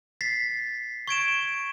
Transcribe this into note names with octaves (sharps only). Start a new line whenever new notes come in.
A6 B6 C7
C#6 G#6 D7 E7